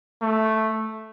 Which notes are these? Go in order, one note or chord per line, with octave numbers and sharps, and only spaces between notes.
A3